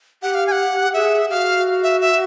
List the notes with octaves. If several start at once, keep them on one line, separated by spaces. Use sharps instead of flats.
G4 F#5
F5
G#5
F#5
G#4 E5
F#4 G4 F5
E5
E5